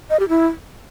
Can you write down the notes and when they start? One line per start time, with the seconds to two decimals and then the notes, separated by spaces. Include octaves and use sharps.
0.10 D#5
0.20 G4
0.29 E4